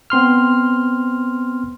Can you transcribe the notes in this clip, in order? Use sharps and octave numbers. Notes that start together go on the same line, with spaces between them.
B3 C4 C6 F6